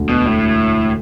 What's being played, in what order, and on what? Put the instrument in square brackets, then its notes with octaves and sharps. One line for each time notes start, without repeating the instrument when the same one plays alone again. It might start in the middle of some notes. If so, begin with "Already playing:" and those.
Already playing: [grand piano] E1 D2 D3
[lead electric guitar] B2
A2